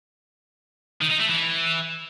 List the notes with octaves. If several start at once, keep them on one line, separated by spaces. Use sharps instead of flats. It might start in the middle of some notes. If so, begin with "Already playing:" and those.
D#3
D#4
A3
E3